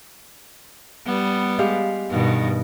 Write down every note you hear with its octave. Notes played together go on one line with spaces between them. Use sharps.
G3 B3
G#3 G4 F5
G2 B2 D#3